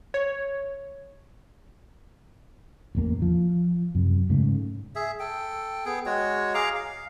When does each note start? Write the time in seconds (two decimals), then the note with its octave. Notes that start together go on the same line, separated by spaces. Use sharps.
0.14 C#5
2.95 A1 E2 A#3
3.22 F3
3.95 F#2 C3
4.30 G#2 C#3 A3
4.95 G#4 E5
5.20 A4 G5
5.85 B3 G#4 G5
6.06 G#3 F#4 C#5
6.54 G#4 F5 A#5 D6
6.75 F5